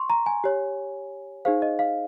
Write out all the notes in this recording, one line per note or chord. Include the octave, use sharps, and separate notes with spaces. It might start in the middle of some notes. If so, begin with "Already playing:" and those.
Already playing: C6 C#6
A#5
G#5
G4 C#5
D#4 G#4 C5 F5
D#5
F5